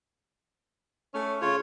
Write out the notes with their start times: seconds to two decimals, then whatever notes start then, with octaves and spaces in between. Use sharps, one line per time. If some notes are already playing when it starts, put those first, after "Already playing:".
1.14 A3 C#4
1.42 C#3 F4 C#5